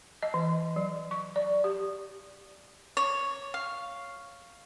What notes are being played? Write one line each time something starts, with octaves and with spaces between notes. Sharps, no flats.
D#5
E3
F#3
C#6
D5
G4
C#5
F5